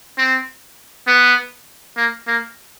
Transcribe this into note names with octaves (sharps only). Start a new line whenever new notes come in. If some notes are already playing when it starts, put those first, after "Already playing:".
C4
B3
A#3
A#3